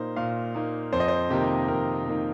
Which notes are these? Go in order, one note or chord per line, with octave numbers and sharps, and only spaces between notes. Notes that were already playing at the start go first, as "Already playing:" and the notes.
Already playing: A#2 A#3 D#4 C5
A#2 F5
A#3 D#4
F2 C5
D#5
C5
C3 D#3 A#3 D#4 G4
F2 A#4
C3 D#3 A#3 D#4